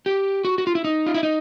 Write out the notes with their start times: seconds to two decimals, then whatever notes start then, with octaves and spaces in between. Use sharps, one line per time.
0.06 G4
0.45 F#4
0.58 F#4
0.67 F4
0.75 E4
0.84 D#4
1.06 F4
1.14 E4
1.23 D#4